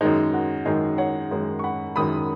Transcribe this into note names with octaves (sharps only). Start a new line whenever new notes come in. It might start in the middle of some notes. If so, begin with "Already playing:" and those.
F#2 D#3 G#3 D#4
F#4
F#2 D#3 G#3 D#4 G#4
C#5 F#5
F#2 D#3 G#3
C#6
F#5 B5
F#2 D#3 G#3 B5 D#6